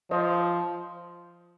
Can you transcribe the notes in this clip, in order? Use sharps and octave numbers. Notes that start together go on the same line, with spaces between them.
F3 C5 D#5